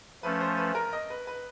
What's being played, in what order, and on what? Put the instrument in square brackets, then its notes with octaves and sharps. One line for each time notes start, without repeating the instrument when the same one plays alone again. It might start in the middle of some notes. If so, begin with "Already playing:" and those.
[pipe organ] F3 A3 C#4 [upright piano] B4
[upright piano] C5
B4
A#4
D#5
B4
B4